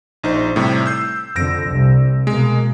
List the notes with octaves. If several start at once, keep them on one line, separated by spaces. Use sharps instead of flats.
A#1 D#4 C5
A2 C3 G3
E6 G6 C7
F2 D3 E6 A#6 D7
C2
B2 G#3 A#3